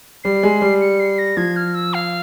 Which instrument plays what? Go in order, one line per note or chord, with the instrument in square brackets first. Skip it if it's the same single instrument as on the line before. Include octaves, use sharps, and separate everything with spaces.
[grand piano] G3 [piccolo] C7
[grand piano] G#3
G3
[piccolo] C#7
C7
A#6
[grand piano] F3 [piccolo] G#6
[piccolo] F6
E6
F5